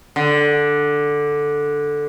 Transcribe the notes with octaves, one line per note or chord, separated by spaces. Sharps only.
D3